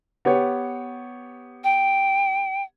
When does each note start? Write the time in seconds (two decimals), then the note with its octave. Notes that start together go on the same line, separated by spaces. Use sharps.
0.25 B3 G4 C#5
1.64 G5